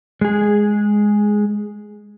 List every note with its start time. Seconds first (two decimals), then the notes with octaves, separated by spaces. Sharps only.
0.21 G#3 G#4